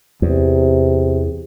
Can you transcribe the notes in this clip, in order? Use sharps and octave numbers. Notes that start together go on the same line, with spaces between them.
E2 C3